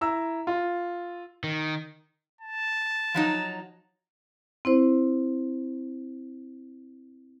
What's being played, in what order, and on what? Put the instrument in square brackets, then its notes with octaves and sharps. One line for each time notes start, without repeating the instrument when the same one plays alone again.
[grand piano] E4 A#5 E6
F4
[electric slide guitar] D#3
[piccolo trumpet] A5
[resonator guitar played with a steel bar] F3 F#3 D#4
[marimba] C4 E4 C5